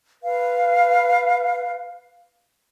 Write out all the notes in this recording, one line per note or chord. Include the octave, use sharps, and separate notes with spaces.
B4 F5